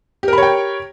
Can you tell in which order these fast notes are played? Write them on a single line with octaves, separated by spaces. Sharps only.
G4 A#4 B5 C#5 G5